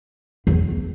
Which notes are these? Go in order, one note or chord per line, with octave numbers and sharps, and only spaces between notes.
E2